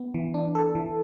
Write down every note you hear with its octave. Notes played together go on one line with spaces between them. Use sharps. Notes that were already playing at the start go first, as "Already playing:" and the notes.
Already playing: B3
E3
D4
A4
E3